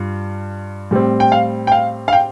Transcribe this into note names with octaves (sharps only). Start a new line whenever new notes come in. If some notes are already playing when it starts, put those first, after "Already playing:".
Already playing: G2 F4
A2 G3 C4
G5
F5
G5
F5
F5
G5